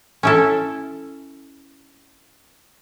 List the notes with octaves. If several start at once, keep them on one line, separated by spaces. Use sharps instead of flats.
C#4 E4 A4